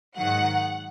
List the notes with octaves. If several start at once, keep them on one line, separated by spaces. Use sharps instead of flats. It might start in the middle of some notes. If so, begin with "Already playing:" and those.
G#2 D#3 F#3 F#5